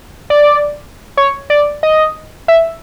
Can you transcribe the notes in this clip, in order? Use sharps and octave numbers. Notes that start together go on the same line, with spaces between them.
D5
C#5
D5
D#5
E5